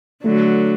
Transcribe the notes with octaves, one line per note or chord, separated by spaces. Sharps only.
D3 F#3 A3